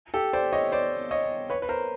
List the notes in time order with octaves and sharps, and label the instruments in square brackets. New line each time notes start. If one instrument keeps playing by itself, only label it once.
[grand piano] G4 A4
C5 D5
C#5 D#5
C5 D5
C#5 D#5
B4 C#5
B4
A#4 C5